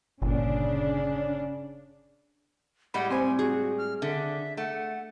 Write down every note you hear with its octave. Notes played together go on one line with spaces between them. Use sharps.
G1 A#2 C#3 D4
A2 G3 G#3 F#5 B5
C4 C5 G#5
F#4 G#4
F6
D3 E5
A3 F#5